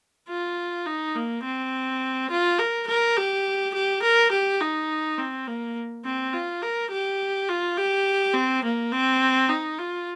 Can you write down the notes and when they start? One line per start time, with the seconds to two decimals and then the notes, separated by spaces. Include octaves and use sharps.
0.29 F4
0.86 D#4
1.15 A#3
1.44 C4
2.30 F4
2.59 A#4
2.87 A#4
3.17 G4
3.74 G4
4.03 A#4
4.32 G4
4.60 D#4
5.18 C4
5.47 A#3
6.05 C4
6.33 F4
6.62 A#4
6.91 G4
7.49 F4
7.77 G4
8.34 C4
8.64 A#3
8.92 C4
9.49 D#4
9.78 F4